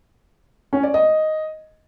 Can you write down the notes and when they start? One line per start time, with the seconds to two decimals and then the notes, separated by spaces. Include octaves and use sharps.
0.73 C#4
0.83 D5
0.94 D#5